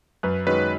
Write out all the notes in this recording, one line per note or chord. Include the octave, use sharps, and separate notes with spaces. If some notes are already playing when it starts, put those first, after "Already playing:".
F#2 B4
D#3 G#3 C#4 F#4 B4